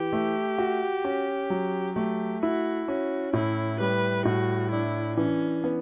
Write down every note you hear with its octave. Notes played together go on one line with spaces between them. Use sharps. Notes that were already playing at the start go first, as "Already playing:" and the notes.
Already playing: E3 G4
A3
F#4
C#4
F#3
A3 G4
E4 F#4
C#4 F#4
A2 E4
G3 B4
A2 F#4
D4 E4
E3 C#4
B3